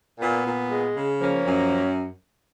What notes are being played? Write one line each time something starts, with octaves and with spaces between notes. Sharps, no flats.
A#2 B3
A#2
G#3
C#3
F3 A#3 C#4
F#2